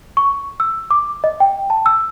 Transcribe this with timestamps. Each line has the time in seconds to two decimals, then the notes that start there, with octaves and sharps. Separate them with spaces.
0.17 C#6
0.60 E6
0.91 D6
1.24 D#5
1.40 G5
1.70 A5
1.86 E6